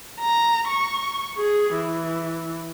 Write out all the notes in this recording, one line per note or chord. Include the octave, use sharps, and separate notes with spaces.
A#5
C#6
G#4
E3